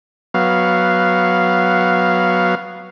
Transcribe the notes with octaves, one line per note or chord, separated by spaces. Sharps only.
F#3 B3 F5